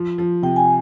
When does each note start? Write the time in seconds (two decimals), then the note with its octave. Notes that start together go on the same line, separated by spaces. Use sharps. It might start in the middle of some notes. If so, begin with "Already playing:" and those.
Already playing: F3
0.18 F3
0.43 C3 G5
0.56 G#5